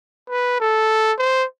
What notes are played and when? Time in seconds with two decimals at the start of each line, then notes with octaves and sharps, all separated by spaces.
0.30 B4
0.60 A4
1.18 C5